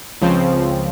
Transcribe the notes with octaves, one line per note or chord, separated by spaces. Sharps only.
C#2 C#3 F3 C4